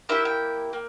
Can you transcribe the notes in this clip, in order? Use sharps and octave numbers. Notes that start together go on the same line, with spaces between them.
A#3 E4 G4 E5
G5
A#3